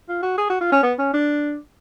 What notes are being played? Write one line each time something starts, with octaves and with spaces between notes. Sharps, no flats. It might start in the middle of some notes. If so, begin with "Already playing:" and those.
F4
F#4
G#4
F#4
F4
C#4
B3
C#4
D4